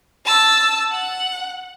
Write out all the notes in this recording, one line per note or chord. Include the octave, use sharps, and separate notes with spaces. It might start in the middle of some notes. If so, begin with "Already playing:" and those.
A5 E6
F#5